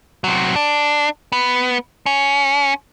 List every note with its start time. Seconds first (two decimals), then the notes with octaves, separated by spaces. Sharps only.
0.24 C3 F#3
0.56 D4
1.32 B3
2.06 C#4